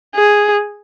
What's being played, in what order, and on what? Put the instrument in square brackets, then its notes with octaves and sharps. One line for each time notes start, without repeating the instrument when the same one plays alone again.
[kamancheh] G#4